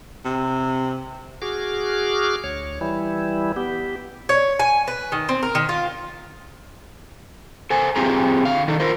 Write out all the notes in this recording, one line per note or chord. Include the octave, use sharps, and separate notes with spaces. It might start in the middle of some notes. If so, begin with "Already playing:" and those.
C3
F#4 G#4 D6 F6
D2 C#5
E3 G3 E4
B3 G4
C#5
G#5
B4
D#3
C4
A#4
D#3
F4
A4 C5 G#5
C4 F4 G4 G#4 A#5
D3 F5
D#3 D#4 A4
F4 A#4 C5